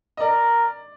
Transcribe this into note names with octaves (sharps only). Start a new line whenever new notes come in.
D#5
A#4 D5